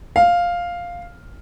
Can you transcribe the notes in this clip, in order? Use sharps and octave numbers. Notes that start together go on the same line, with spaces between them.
F5